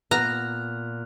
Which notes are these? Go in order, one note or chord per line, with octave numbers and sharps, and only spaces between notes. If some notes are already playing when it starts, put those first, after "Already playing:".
A#2 B3 A#5 F6 F#6 F7